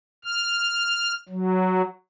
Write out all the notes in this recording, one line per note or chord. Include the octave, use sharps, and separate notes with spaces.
F6
F#3